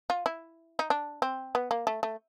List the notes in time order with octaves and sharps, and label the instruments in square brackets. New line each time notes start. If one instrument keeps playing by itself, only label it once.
[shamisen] F4
E4
D#4
D4
C4
B3
A#3
A3
A3